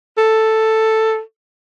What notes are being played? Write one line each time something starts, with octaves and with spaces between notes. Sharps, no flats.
A4